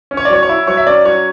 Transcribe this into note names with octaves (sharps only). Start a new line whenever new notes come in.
C#4
C#5
D5
F#3 C#5
C#5
E4
F#3 C#5
E5
C#4 D5
F#3 C#5